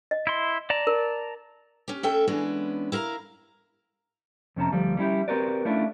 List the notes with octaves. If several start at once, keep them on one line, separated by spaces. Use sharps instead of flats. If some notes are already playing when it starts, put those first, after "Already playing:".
D#5
E4 C6
D5 A5 A#5
A#4
C#4 G4
A3 C#4 A4 E5 G5
E3 G#3 B3 C#4 D4
E4 A#4 F5 A#5
F2 C3 C#4 A5 A#5
D2 F3 G3
G3 C#4 E4 G4
C4 F#4 G4 A#4 B4 D5
A3 C#4 D4 E4 F4